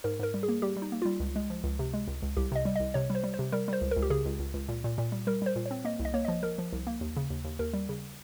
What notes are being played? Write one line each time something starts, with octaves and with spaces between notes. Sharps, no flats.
G#2 A#4
G#2 A#4
G3
G#4
A#3
G3 G4
G3
D#4
A#3
G3 F4
C#2
G#3
F3
C#2
C3
G#3
C#2
C#2
C2 G4
C3 D#5
G3
C2 D#5
C3 C#5
G3
C5
G3
C5
C3
G3 A#4
G3 C5
C#2
A#4
C#2
G4
C#3 G#4
C#2
C#2
C#2
A#2
A#2
A#2
G3
G3 A#4
G3 C5
A#2
C#5
C4
A#3 D#5
C2
D#5
A#3 C#5
F3 D#5
F3 A#4
F3
C2
A#3
D#2
C#3
D#2
D#2
D#2 A#4
G3
C#3